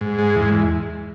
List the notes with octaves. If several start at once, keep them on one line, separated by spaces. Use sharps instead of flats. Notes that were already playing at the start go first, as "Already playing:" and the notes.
G#2
G#3
E2